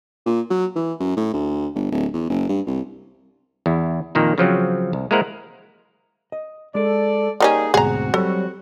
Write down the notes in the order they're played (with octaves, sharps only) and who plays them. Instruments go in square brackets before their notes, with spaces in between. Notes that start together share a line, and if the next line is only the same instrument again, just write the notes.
[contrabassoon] A#2
F#3
E3
F#2
A2
D2
G1
D1
E2
F#1
G2
C2
[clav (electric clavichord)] E2 E4
F2 A#2 D#3 A#3
C#3 F3 F#3 C4
C2
G#3 A#3 E4 A#4 C5 F#5
[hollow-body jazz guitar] D#5
[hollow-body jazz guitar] G#3 [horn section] A4 D5
[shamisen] D#3 G3 C#4 [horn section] A#3 D#4 G#4 [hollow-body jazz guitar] A#4
[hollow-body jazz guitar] D2 G#2 B2 [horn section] C4 F#4 [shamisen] G#4 A#5
[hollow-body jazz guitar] F#3 G3 C#5 [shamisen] A4